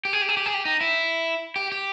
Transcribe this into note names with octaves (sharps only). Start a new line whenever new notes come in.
G4
G#4
G4
G#4
G4
G#4
G4
D#4
E4
G4
G4